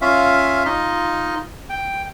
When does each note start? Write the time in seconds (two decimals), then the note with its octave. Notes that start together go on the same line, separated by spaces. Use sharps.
0.01 C#4 F4 E5 F5
0.65 D#4 F4 D#5
1.70 G5